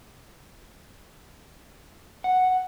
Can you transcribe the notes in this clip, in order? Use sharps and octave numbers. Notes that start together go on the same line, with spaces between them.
F#5